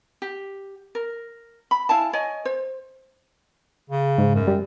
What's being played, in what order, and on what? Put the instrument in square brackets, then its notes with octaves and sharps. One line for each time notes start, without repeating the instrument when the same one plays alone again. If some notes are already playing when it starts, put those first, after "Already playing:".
[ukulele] G4
A#4
B5
E4 F5 G#5 A5
C#5 D#5 G#5
C5
[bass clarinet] C#3
[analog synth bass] G#2
[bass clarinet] F#2
[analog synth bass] G3